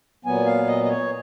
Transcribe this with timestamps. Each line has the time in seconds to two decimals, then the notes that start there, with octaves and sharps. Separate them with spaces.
0.25 A#2 F#3 B3 G#5
0.46 F5
0.67 D#5
0.84 D#5
0.88 C#5